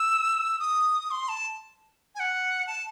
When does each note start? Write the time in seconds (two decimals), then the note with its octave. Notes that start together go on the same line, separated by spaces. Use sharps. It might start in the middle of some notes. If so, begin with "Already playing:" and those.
Already playing: E6
0.59 D#6
1.11 C6
1.29 A5
2.15 G#5
2.20 F#5
2.67 A5